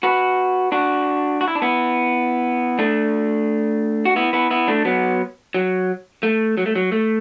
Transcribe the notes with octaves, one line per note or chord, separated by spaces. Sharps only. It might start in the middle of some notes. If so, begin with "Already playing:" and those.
F#4 B4
D4 F#4
F#4
E4
D4
B3 E4
A3 D4
F#4
B3 E4
B3 E4
B3 E4
A3 D4
F#3 B3
F#3
A3
F#3
A3
F#3
A3